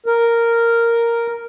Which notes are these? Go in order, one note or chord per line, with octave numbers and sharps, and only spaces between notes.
A#4